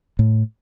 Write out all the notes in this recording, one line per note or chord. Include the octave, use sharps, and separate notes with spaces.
A2